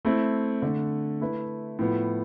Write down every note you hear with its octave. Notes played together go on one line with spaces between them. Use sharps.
A3 C4 E4
D3 A3 D4
A3 E4 B4
A2 F3 B3